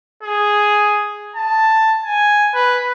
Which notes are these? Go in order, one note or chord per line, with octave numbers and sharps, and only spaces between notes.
G#4
A5
G#5
B4